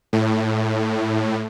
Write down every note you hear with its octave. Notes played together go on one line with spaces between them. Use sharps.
A2